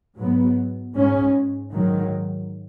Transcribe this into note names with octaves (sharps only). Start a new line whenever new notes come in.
G#2 F#3 B3
G#2 G#3 C#4
G#2 D#3 F#3